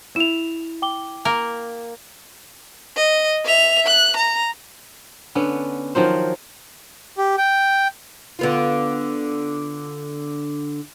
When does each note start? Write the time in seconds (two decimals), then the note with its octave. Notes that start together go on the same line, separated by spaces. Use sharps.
0.16 E4 E7 F7
0.82 G5 D6 G7
1.25 A#3 A#4
2.96 D#5
3.45 E5 F7
3.86 F#6
4.16 A#5
5.35 D3 B3 C#4
5.95 D#3 F3 F#3 C5
7.18 G4
7.38 G5
8.39 D3 B3 F4